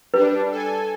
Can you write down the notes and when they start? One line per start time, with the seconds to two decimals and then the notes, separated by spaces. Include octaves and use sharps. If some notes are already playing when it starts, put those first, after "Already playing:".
0.14 G3 D4 B4
0.51 A4 G#5